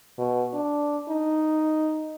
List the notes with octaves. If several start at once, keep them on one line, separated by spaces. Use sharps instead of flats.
B2
D4
D#4